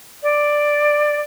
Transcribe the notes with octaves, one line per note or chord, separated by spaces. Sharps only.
D5